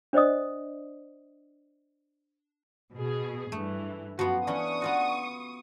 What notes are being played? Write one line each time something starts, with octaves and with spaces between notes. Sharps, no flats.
D4 C5 D5 D#5 D#6
B2 G#4
G2 E3 A3
F#2 F3 B3 F#4
E3 C#4 D4 C#6 D#6
B3 F4 F#4